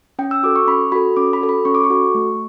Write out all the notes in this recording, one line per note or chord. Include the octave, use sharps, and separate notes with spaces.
C#4 G5
E6
F#4 A4 D6
C#6
C#4 B5
F#4 A4 B5
C#4 D6
B5
F#4 A4
B5
C#4 C#6
D6
C#6
F#4 A4
A3